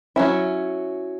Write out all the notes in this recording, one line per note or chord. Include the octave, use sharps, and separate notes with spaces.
F#3 C#4 E4